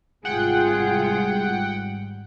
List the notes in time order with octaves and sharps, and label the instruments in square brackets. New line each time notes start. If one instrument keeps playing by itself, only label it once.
[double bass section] G#1 G#2 G3 [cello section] C3 F4 [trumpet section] G#4 [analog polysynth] F#5 G5